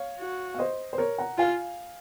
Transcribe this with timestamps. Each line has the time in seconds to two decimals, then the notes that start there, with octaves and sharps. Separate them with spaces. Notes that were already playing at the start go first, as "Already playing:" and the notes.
Already playing: C#5 F5
0.19 F#4
0.54 F5
0.58 C5 D#5
0.93 C5
0.98 A#4 C#5
1.18 F#5 A#5
1.38 F4 F5 G#5